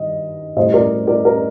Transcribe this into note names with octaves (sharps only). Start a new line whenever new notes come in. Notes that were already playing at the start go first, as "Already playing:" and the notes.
Already playing: G2 D#3 D#5
A2 G3 C5 D#5
A#4 D5
A#4 D5
G4 A#4